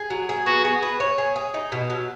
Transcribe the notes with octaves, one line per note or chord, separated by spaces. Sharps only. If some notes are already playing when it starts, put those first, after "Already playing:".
Already playing: G#4
F#3
G#4
B3 F#4
G#4
B4
C#5
G#4
G#4
D#4
B2
F#3